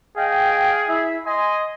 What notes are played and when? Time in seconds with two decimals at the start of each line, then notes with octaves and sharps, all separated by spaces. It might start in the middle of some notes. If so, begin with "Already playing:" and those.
0.18 G#4 D#5 F5 G5
0.88 E4 E5
1.27 D#5 G#5 C6